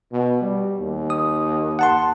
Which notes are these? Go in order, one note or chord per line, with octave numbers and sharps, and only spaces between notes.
B2
G3
D#2
D#6
F#5 A5 C6